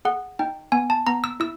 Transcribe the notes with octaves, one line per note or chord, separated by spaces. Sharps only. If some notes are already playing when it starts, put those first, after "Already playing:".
G#4 F#5
D#4 G5
B3 G#5
A5
B3 A#5
E6
E4 E6